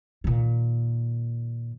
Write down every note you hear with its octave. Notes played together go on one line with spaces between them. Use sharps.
A#2 D#3